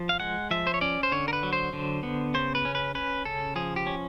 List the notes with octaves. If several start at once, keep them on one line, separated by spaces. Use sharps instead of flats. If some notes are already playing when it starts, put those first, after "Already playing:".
Already playing: F3
F5
G#3 F#5
F3 E5
C5
C#5
C#4 D5
C5
D3 C#5
A#4
B4
F#3
C5
D3
B3
C#3 C5
B4
C#4
B4
C#4 B4
C#3 A4
F3 G#4
G4
C#4